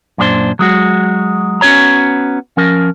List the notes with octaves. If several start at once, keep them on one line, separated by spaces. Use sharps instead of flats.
F#2 A#2 D4 F#4 C5
F#3 G#3 F#4
B3 C#4 F#4 C#5 A#5
F3 C#4 A#4